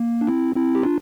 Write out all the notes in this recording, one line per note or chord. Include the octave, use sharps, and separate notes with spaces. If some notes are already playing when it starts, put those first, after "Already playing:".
Already playing: A#3
D4
C4 E4
C4 E4
G4
D4 F4